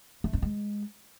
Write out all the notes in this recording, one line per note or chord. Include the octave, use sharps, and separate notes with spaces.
A3
D#4
G#3